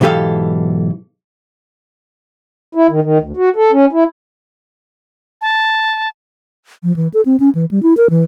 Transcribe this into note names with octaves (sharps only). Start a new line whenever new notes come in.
B1 G#2 E3 G4 A4 F5
E4
D#3
D#3
D2
F#4
A4
C#4
E4
A5
F3
E3
A4
C4
C#4
E3
G3
E4
A#4
E3